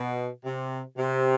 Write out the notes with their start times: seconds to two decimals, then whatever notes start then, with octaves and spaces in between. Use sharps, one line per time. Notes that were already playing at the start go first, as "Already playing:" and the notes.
Already playing: B2
0.44 C3
0.98 C3